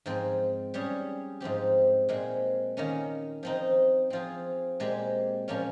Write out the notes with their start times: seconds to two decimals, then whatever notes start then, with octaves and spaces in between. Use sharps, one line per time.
0.06 G#2 F3 C4
0.74 G3 C#4 G#4
1.40 G#2 F3 C4 G4
2.09 A#2 G#3 C4
2.77 D#3 A#3 C#4
3.43 F3 C4 D#4
4.10 F3 C4 F4 G#4
4.80 A#2 G#3 C4 G4
5.48 A#2 F3 A#3 C#4